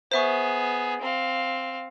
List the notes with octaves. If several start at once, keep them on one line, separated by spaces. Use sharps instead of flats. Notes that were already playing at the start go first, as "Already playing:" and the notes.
B3 G#4 C5 E5 C#6
C4 F5